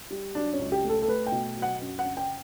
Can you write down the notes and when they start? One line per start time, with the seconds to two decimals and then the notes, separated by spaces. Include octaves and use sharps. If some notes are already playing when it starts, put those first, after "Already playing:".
0.10 G3
0.35 F#3 D4
0.53 C#4
0.59 C#2
0.72 G4
0.84 A3
0.89 A4
1.02 A4
1.08 A3 B4
1.26 G5
1.32 B2
1.56 F#3
1.62 F#5
1.81 F#2
1.99 F#5
2.05 C#3
2.17 G5